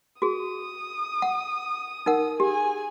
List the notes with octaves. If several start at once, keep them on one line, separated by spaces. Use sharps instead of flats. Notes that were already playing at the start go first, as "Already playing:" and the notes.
F#4 G#4 D#6
F#5
D#4 A#4 F#5
G4 G#4 G#5